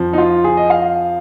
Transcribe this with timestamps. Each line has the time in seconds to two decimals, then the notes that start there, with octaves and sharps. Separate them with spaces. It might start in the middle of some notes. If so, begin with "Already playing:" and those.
Already playing: F2 F3
0.13 D#4
0.18 F4
0.44 G#4
0.57 D#5
0.70 F5